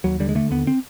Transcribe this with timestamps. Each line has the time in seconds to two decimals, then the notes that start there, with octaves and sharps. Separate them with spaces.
0.04 D#2 F#3
0.20 D3 G3
0.29 G#3
0.35 D3 A3
0.51 D#2 B3
0.67 C4